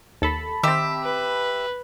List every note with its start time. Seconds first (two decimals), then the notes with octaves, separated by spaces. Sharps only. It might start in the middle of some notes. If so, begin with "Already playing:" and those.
0.22 D#2 A4 A5 B5
0.63 D#3 C4 G4 E5
1.03 B4